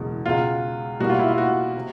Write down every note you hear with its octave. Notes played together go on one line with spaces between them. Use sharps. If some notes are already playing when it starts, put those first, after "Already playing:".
Already playing: F#1 E2 B2 G#3
C#2 B2 G#3 F4
C2 B2 G3 A#3 F#4
F4
E4
F4
F#4
C3